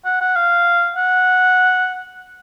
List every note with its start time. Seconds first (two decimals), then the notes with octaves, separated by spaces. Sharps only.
0.05 F#5
0.21 F#5
0.36 F5
0.97 F#5